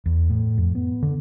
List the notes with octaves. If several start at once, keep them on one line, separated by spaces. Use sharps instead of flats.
E2
A2
F2
B3
D3